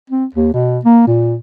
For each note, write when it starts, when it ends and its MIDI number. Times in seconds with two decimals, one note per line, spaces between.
0.10 0.25 60
0.35 0.49 39
0.54 0.79 47
0.85 1.05 58
1.07 1.37 46